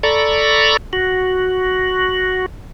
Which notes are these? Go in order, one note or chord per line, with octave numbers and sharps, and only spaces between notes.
A4 D5 A#5 B5 C#6
F#4